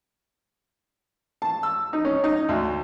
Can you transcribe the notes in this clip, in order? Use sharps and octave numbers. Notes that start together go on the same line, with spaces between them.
A5
E6
D#4
C#4
D#4
D2